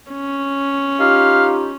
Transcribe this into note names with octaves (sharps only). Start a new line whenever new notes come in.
C#4
D#4 F4 G4 F5